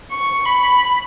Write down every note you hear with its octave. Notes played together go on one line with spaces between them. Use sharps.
C#6
B5